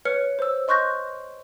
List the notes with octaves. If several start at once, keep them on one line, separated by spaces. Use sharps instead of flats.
B4 C#5 F6 C#7
C5 E6
D#5 C6 C#6 F#6 G6 A#6